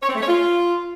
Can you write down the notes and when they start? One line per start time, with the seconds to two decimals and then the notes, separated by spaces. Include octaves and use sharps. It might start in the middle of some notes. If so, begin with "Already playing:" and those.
0.02 C#5
0.09 C4
0.15 A3
0.22 C#5
0.28 F4